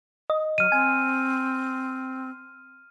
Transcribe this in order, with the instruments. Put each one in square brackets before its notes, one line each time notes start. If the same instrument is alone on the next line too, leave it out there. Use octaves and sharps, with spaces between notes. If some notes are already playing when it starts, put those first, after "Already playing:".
[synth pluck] D#5
[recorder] F#3 [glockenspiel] F6 D#7
[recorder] C4 [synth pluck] G#5